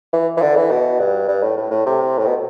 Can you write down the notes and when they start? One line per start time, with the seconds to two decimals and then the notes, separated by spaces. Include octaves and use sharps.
0.13 E3
0.37 E3
0.42 D3
0.56 E3
0.71 B2
0.99 G2
1.28 G2
1.43 A2
1.57 A2
1.71 A2
1.86 C3
2.18 A2
2.26 B2